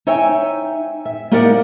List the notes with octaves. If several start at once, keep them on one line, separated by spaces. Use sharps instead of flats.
D#4 C#5 E5 G5 G#5
E5
A#3 D#4 G4 A#4 D5 F#5